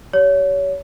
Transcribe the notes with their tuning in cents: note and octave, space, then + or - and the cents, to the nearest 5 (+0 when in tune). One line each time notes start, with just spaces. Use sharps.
G4 -20 C#5 +25